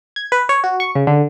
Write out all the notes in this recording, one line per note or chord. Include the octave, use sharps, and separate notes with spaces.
G#6
B4
C#5
F#4
C#6
C#3
D3